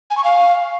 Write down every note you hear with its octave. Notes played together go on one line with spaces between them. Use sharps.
G#5
C#6
F5